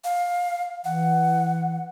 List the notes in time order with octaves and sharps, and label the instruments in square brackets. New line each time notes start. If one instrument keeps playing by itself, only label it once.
[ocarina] F5
[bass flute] E3 [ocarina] F#5